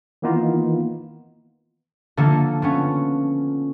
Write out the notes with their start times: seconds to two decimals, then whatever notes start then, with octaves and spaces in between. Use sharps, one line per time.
0.22 D#3 E3 A#3 B3 D#4 F4
2.17 D3 F3 A#3 A4
2.62 F3 B3 C#4